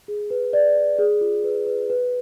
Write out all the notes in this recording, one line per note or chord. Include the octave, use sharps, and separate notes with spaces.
G#4
B4
D5
D5
G#4
F4
B4
B4
B4